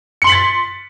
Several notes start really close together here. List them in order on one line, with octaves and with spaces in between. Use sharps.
C#7 C6 F#7 B6 A6